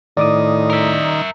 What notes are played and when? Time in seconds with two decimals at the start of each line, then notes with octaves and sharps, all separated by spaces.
0.17 A2 D#3 D5 D6 D#6
0.70 A#4 E5